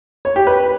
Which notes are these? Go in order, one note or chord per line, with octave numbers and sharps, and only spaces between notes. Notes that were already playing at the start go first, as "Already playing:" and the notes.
C#5
G4
B4